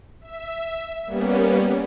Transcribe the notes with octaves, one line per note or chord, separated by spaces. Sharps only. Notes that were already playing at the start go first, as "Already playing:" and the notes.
E5
G3 A#3 B3 C#4